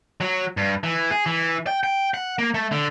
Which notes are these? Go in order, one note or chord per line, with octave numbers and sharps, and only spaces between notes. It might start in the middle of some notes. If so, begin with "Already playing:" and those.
F#3
G2
E3
G#4
E3
G5
G5
F#5
A#3
A3
D3